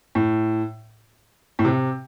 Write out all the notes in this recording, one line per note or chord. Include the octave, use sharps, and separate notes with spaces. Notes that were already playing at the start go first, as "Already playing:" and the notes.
A2
A2
C3